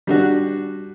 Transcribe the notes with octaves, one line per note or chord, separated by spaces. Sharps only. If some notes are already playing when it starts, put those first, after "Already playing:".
G3 D4 F#4